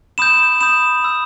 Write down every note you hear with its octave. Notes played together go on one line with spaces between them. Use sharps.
B5 D#6 G6 E7
B5 D#6 G6 E7
B5 E6 G6